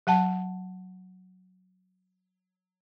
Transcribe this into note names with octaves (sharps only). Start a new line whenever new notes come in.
F#3 F#5 A5